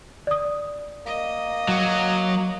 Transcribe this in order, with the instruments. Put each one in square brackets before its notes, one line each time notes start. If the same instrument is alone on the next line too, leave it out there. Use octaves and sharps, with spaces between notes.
[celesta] D5 D#6
[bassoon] A#3 [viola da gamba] D#5
[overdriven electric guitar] F#3